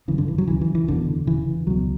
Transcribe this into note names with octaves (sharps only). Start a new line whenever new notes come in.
G1 F#2 C#3 E3
D3
E3
F#3
D2 C#3 E3
E3
E3
F#1 E2 B2 D3
E1 D2 C#3 E3
C#2 B2 F#3